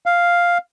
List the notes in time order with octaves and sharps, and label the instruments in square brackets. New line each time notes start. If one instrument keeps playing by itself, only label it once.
[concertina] F5